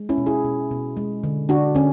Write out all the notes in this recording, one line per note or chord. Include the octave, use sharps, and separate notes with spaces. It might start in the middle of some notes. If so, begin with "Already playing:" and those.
Already playing: G#3
C#4 E4
B2
E4 G#4
B2
B2
G#3
D3
D3 D4 F#4
D3 C#4